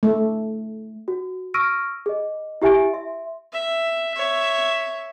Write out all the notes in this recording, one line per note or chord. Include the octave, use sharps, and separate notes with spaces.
A3
F#4
C#6 E6 F6 A#6 D7 D#7
G#4 D#5
E4 G4 E5 G#5 A6 D7
E5 C6
E5
C#5 E5